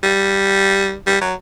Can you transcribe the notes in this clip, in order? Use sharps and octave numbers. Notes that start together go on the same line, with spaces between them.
G3
G3
F#3